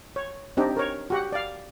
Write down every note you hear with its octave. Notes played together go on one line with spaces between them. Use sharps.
C#5
C4 D4 D#4 G4
A#4 C#5
F#4 G4 F#5
D5 F5